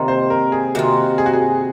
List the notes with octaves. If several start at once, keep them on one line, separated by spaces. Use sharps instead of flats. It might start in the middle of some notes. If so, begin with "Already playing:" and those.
Already playing: C3 D#3 A#3 F4
C5
A#4
G#4
C3 D#3 A#3 F4 F#4
G#4
F#4
G#4